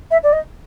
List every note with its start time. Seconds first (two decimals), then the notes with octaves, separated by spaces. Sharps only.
0.11 E5
0.23 D5
0.33 D#5